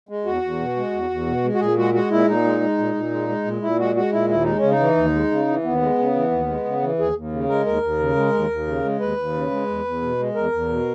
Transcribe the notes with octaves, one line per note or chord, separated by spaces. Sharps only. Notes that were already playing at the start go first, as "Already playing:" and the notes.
G#3
E2 F#4
E2
B2
G#3
E2
E2
B2
G#3
F#4
A#2 G#4
G#3 F#4
G#3 F#4
A#2 E4
A#2 D#4
G#3
G#3
A#2
A#2
G#3
G#3
A#2
A#2 E4
G#3 F#4
G#3 F#4
A#2 E4
D#2 E4
G#3 D#4
C#4
C#3
D#4
E3
D#2
G#3
C#3
E3
D#2 B3
G#3
C#3
E3
D#2
G#3
C#3
E3
D#2 G#4
D#2
C#3
G#3 A#4
D#2 A#4
D#2
C#3
G#3
D#2
D#2
C#3
G#3
D#2 B4
D#2
C#3
G#3
E2
E2
B2
G#3
E2 A#4
E2
B2